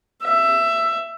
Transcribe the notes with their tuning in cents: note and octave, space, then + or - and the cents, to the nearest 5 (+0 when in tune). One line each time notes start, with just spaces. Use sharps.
E5 +15